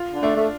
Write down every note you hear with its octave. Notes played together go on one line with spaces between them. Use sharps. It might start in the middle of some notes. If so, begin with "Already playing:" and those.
Already playing: F4
D3
A3 D4
A3